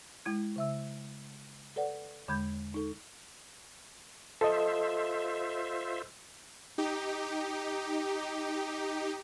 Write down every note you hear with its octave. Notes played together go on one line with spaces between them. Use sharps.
G#3 E4 G#6
C#3 E5 E6
A4 B4 D5 F#5
E2 D3 G#3 B5 G6 G#6
D#4 A4
F4 A4 C5 D#5 E5
D#4 G4